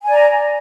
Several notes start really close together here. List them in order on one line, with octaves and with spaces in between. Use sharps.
G#5 D5 A#5